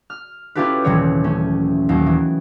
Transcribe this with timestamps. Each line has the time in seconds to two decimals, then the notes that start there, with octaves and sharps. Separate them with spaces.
0.10 F6
0.55 C#4 E4 F4 G4 A4 B4
0.84 D#1 C3 E3 F#3 G#4 C#5
1.24 A3 C#4
1.89 D#2 F#3
2.06 E3